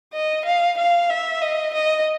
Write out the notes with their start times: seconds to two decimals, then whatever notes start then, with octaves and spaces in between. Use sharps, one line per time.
0.13 D#5
0.46 F5
0.78 F5
1.10 E5
1.41 D#5
1.74 D#5